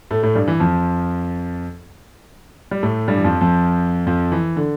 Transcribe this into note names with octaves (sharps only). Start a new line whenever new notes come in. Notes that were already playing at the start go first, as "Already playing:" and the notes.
A2 A3
A2 A3
G2 G3
E3
F2 F3
G3
A2 A3
G2 G3
E3
F2 F3
F2 F3
F2 F3
E3
D3